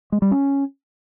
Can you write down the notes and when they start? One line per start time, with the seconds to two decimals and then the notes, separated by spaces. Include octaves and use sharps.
0.12 G#3
0.22 G3
0.31 C#4